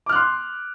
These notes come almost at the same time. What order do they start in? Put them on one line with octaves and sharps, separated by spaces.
D6 F6 F#6 C6